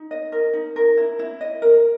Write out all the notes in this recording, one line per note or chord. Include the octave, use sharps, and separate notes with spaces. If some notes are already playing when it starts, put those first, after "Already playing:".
Already playing: D#4
D#5
A#4
D#4
A#4
E4
E4
D#5
A#4